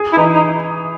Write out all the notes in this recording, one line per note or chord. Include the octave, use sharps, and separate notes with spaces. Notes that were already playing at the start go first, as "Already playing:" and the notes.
Already playing: G#4
E4
E3 D#4
D#4